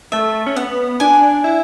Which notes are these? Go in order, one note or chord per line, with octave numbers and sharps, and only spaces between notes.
A3 E5
C#4
B3 F#5
D4 G#5
E4